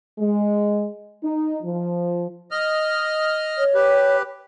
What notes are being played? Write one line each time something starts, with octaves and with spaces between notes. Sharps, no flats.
G#3
D#4
F3
D#5 F6
C#5
G4 B4